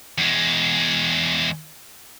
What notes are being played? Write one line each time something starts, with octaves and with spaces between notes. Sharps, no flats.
E2 G#3